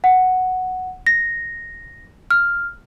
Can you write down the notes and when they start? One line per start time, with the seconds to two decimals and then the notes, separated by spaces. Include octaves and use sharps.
0.04 F#5
1.07 A#6
2.31 F6